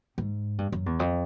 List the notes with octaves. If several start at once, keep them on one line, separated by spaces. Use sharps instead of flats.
G#2
G2
F#2
E2
F2